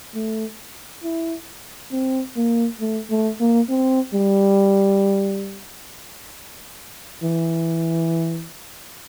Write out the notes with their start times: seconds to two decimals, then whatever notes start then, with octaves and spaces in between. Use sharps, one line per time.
0.15 A3
1.04 E4
1.92 C4
2.37 A#3
2.81 A3
3.10 A3
3.40 A#3
3.69 C4
4.14 G3
7.23 E3